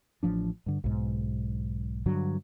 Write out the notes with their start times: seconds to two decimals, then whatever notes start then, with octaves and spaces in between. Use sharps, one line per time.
0.23 A1 F3 D4
0.66 G2 D3
0.84 B1 G#2
2.06 G2 D3 F#3